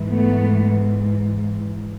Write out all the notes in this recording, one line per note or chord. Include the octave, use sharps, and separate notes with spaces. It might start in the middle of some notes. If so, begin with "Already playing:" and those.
Already playing: G#2 E3
A3 B3